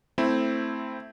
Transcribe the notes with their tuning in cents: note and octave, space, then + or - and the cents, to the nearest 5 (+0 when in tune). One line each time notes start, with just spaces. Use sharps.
A3 +15 C4 +0 E4 +0